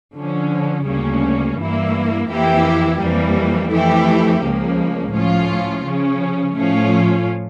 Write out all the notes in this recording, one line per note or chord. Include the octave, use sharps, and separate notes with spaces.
D3 F3 C#4
D2 C#3 G3 A#3 C#4
G2 E3 A#3 E4
F2 E3 A#3 E4 G4
F2 E3 G3 A#3
F2 E3 A3 E4 G4
C#2 C#3 F3 A#3
A2 F3 C#4 F4
C#3 F3 C#4
A2 F3 A3 C#4 F4